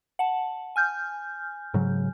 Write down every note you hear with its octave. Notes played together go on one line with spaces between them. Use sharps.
F#5 A5
G#5 F6 G6
G#2 C#3 F#3